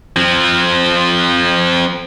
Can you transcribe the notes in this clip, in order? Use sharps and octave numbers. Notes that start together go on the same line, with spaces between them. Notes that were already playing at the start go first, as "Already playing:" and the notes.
F3 C4